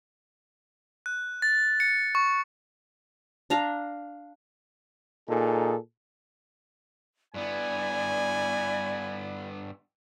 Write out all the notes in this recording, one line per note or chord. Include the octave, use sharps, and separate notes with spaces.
F#6
A6
C#7
C#6
D4 F5 A#5
A#2 D#4 G#4 A4
G2 B3 E4 D5 G#5 B5